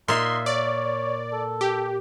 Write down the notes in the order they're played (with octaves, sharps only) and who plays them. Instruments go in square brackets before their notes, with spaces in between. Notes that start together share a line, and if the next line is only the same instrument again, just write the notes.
[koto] A#2 E5 [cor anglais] D#4 [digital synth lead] C6
[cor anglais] C#5 [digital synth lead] D5
[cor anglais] A4
[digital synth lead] G4